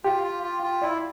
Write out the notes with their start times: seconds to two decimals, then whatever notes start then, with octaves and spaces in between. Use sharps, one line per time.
0.04 F4 G4
0.24 F4
0.43 F4
0.63 F4
0.82 E4 D5